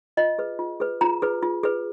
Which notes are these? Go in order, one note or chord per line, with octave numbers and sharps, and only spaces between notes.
F4 D#5
G#4 B4
F4
G#4 B4
F4 A#5
G#4 B4
F4
G#4 B4